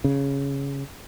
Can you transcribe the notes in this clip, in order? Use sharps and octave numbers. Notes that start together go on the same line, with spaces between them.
C#3